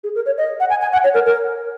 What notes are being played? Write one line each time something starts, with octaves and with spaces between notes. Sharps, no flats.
G#4
A#4
C#5
D#5
F#5
G#5
G#5
F#5
C#5
A#4
A#4